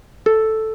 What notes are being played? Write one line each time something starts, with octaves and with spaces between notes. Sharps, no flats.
A4